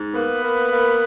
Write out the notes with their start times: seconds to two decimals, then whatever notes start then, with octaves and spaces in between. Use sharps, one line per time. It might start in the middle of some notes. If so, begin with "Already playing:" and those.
Already playing: G#2
0.13 A#3 B3 B4
0.42 A#3
0.70 A#3